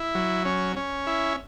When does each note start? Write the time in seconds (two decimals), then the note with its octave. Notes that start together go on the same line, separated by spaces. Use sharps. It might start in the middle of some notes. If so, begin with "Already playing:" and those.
Already playing: E4
0.15 F#3
0.45 C#4
0.76 C#4
1.07 E4